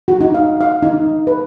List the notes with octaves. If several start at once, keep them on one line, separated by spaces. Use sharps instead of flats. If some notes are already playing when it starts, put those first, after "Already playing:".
F#4
D#4
F5
F5
D#4
B4